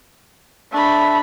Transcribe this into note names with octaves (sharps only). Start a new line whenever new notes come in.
A3 D4 E5 B5